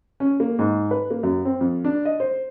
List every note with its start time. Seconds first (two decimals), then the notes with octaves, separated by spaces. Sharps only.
0.20 C#4
0.40 A#3
0.59 G#2
0.91 B4
1.11 A#3
1.23 F#2
1.45 C4
1.61 F2
1.85 D4
2.05 D#5
2.20 C5